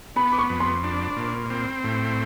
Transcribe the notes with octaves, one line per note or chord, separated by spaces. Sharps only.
B3 B5
D6
C#6
F2
C6
D4
A#2
C4
A2